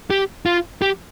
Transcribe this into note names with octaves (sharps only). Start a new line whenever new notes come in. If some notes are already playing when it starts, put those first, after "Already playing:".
G4
F4
G4